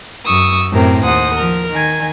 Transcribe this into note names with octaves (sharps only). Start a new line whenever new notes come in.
F#2 C#6 D#6 E6
F#2 A2 C3 C4 A#4
D#2 C5 F#5 D#6
F3 A#4
D#3 G#5 G#6